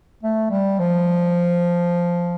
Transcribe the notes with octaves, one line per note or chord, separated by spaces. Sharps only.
A3
G3
F3